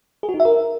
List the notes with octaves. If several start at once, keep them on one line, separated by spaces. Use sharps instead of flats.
G#4
F#4
D#4
E5
A#4